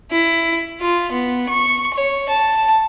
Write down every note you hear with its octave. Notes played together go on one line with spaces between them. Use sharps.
E4
F4
B3
C#6
C#5
A5